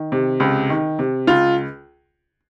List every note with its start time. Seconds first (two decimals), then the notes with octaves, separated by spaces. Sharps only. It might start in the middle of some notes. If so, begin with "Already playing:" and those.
Already playing: D#3
0.12 C3
0.40 C#2
0.70 D#3
0.99 C3
1.27 C#2 F4